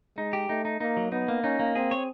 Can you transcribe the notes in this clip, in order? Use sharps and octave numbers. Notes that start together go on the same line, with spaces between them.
G#3 D#4
G4
A3 D#4
D#4
A#3 D#4
F#3
B3 D#4
A#3
C#4 D#4
A#3
C4 G#4
C#5